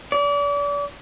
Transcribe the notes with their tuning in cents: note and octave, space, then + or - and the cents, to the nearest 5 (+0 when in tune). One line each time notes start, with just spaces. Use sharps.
D5 -35